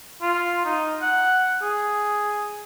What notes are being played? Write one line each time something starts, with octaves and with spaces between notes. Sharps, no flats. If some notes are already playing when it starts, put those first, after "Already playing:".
F4
D#4
F#5
G#4